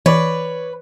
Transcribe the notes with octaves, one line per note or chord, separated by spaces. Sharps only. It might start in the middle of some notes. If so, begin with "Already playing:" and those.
E3 B4 C#5 D5